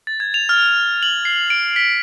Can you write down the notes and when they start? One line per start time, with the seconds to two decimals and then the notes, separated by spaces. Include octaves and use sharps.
0.07 A6
0.20 G#6
0.34 F7
0.49 F6
1.03 F#7
1.25 C7
1.50 D7
1.76 B6